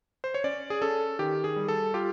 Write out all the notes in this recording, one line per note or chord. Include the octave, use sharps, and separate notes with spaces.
C5
C#5
C#4 D5
G#4
C#4 A4
D#3 G4
G#4
G3
A4
F4 G4